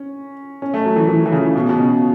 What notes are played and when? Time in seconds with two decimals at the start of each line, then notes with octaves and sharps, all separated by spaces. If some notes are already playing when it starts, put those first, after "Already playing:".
Already playing: C#4
0.62 C#4
0.74 A3
0.86 F#3
0.96 E3
1.09 E3
1.26 E3
1.32 C#3
1.56 B2
1.69 B2
1.78 C#3